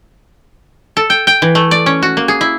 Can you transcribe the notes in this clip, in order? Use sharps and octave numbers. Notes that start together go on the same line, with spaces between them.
A4
G5
G5
E3
A3
D5
C#4
F#4
A#3
G#4
E4